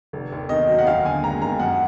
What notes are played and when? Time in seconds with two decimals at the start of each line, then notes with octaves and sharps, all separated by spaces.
0.13 F1
0.32 D#2
0.49 D#3 D#5
0.68 F#3
0.79 F#5
0.86 D#2 F5
1.05 D3 G#5
1.23 G#3 A#5
1.42 D#2 A#5
1.60 F#2 F#5